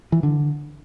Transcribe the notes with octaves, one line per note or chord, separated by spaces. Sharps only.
E3
D3